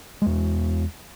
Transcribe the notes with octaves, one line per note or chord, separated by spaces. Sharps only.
E2 G#3